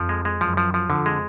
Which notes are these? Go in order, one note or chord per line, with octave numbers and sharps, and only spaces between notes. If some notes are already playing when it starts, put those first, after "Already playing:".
Already playing: F2 F3
G#3
G#3
F#2 F3
F3
F3
F2 D3
G#3